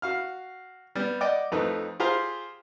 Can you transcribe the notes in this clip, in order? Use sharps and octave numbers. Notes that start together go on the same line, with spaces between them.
F#4 F5 F6
G3 B3
D5 D#5 F#5 G5 D6
F2 A3 D#4 B4
F4 G4 G#4 C5 F5 A#5